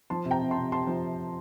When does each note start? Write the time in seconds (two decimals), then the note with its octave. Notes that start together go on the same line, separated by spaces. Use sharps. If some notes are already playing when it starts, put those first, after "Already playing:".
0.10 F3 A5 C6
0.25 C3
0.31 G5 A#5
0.42 C3
0.51 A5 C6
0.57 C3
0.72 C3 A5 C6
0.87 F3